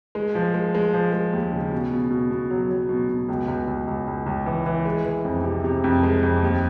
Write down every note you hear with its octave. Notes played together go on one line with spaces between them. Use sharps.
G#3
F3
G#3
G#3
F3
G#3
D#2
C#3
B2
B2
B2
B2
F#3
F#3
B2
B2
C#2
C#2
C#2
C#2
C#2
C#2
E3
E3
G#3
E3
F2
C3
C3
F2
G#3
F2
D#2